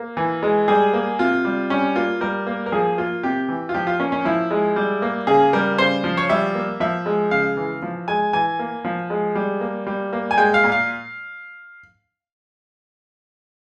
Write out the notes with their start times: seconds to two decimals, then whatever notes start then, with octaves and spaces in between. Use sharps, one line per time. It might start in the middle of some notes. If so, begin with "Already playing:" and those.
Already playing: A#3
0.17 E3
0.43 G#3
0.68 G3 G#4
0.93 A#3
1.19 C3 F4
1.45 G3
1.70 G3 C#4
1.96 A#3 F4
2.21 G3 A#4
2.47 A#3
2.66 A#4
2.72 F3 G#4
2.98 A#3 F4
3.23 C3 G4
3.49 E3
3.69 F4
3.74 F3 G4
3.87 F4
4.00 A#3 C#4
4.12 C#4
4.25 F3 E4
4.51 G#3
4.76 G3
5.02 A#3
5.27 C#3 G#4
5.53 G3 A#4
5.78 C#3 C5
6.04 F3
6.17 C#5
6.29 G3 E5
6.55 A#3
6.80 F3 E5
7.06 G#3
7.31 C#3 F5
7.57 E3
7.82 F3
8.08 G#3 G#5
8.33 E3 G#5
8.59 A#3
8.84 F3
9.10 G#3
9.35 G3
9.61 A#3
9.87 G3
10.13 A#3
10.31 G#5
10.37 G#3 G5
10.54 F5
10.64 A#2
10.72 F5